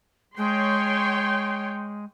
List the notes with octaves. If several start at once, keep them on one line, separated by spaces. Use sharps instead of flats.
G#3 C#5 G5 C6